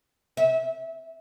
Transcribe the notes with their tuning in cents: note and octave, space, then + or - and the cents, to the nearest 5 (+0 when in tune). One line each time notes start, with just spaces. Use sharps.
E5 -35